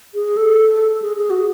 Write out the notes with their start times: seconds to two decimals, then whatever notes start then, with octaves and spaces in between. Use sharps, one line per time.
0.14 G#4
0.37 A4
1.02 G#4
1.17 G#4
1.30 F#4